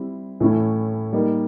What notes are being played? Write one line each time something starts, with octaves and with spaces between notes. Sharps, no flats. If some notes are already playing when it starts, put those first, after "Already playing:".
Already playing: G3 C4 E4
A2 E3 A3 C#4 E4
G3 A#3 D#4